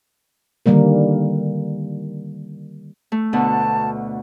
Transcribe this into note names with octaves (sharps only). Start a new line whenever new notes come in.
D3 D#3 G3 A#3 A#4
A3
D2 B2 D3 A5